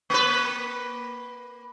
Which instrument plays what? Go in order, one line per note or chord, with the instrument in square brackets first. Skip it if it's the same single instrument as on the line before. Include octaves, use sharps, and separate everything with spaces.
[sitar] A#3 B4